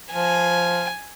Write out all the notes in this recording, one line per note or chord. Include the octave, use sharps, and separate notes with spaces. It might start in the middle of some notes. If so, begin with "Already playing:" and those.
F3 G#5